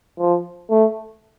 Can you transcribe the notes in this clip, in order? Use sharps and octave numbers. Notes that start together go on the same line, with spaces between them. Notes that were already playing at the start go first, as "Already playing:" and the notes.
F3
A3